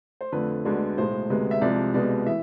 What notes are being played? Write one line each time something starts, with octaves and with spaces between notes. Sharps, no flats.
C5
F2 D3 A3 B4
D2 D3 G#3 B3
B1 A2 G#3 C5
D2 C3 G#3 B3
E5
C2 C3 F3 G#3 D5
C2 B2 G#3 B3 D5
E3 E5